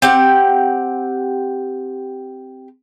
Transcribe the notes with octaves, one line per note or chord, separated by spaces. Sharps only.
C4 G4 F#5